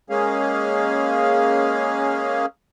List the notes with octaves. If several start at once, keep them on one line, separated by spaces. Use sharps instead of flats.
G#3 A#3 C#4 G#4 F5